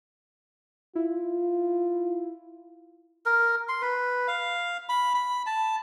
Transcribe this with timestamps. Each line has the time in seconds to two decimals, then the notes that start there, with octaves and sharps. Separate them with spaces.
0.95 E4 F4
3.26 A#4
3.69 C6
3.82 B4
4.28 F5
4.89 B5
5.15 B5
5.46 A5